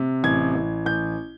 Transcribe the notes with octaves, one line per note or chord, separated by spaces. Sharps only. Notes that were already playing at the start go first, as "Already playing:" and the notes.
Already playing: C3
A1 G#6
A1
A1 G6